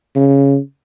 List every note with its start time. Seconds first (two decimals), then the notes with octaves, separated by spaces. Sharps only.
0.16 C#3